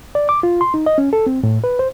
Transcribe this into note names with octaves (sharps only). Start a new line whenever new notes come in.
D5
D6
F4
C6
D#4
D#5
C#4
A4
C4
A2
B4
C5